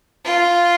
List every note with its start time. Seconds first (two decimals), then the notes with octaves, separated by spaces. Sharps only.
0.25 F4